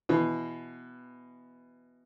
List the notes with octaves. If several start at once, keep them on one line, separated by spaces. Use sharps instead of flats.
B2 E3